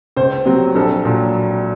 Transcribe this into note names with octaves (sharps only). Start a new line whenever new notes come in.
C#2 C5
C3 F#3 C4
A#1 A4
A#2 F#3